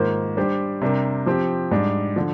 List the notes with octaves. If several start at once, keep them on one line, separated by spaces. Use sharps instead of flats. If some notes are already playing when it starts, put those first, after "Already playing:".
Already playing: G#2 D#3 A#3 F4 C5
G3 D4 G4 C5
C3 G3 D4 G4 A#4
F3 C4 G4
G#2 G3 D4
D3 F3